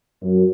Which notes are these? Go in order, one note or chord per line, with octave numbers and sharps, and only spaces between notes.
F#2